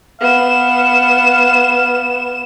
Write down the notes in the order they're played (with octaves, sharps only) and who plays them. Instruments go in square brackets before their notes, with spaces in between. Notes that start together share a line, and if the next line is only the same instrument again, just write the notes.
[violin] B3 E7 [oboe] F5